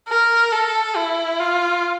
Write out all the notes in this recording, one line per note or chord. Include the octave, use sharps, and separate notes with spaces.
A#4
A4
E4
F4